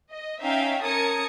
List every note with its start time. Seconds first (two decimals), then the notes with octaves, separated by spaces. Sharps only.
0.10 D#5
0.42 C#4 D#4 E5 F5 G5 G#5
0.83 C#4 A#4 A5 D#6 G#6 C#7